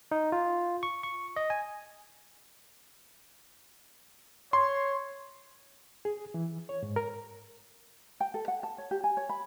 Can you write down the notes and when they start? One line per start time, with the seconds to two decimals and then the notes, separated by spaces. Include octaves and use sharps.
0.12 D#4
0.32 F4
0.83 C#6
1.03 C#6
1.36 D#5
1.50 G#5
4.53 C#5 C6
6.05 G#4
6.34 E3
6.69 C#5
6.83 G#2
6.96 A#4
8.20 G5
8.34 A4
8.48 F#5
8.63 A5
8.78 C#5
8.91 G4
9.04 G#5
9.17 C#5
9.29 B5